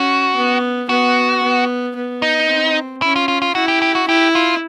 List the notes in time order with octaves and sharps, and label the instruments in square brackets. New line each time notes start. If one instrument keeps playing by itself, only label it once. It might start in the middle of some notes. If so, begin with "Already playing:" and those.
Already playing: [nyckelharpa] C#4 [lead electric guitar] F#4
[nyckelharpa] B3
[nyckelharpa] B3 [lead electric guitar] F#4
[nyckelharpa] B3
B3
[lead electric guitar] D#4
[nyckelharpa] C4
[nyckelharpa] C#4 [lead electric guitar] E4
[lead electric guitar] F4
F4
F4
[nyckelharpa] E4 [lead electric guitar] F#4
[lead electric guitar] G4
G4
F#4
[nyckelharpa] E4 [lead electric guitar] G4
[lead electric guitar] F4